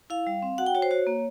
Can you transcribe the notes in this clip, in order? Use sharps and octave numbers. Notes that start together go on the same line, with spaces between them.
E4 F5
G3
C4
F#4 F#5
G5
F#4 C#5
C5
F#4 C#5
A#3